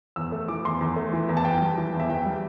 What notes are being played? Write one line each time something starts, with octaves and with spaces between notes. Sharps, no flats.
E2 E6
A3
E3 D6
E2 C6
E2
A3
E3
E2
A5
E2 G5
G3
E3
E2
E5
E2 G5
G3